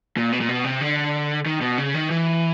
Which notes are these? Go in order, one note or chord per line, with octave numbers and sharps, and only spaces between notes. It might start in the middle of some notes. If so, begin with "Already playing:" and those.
A#2
B2
A#2
B2
C3
D3
D#3
B2
C#3
D#3
E3